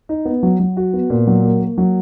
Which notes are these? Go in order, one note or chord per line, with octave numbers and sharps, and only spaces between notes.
D#4
B3
F#3
F#3
F#4
B3
A#2
F#3
A#3
A#3
F#3